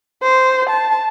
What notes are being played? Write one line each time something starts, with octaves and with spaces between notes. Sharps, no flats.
C5
A5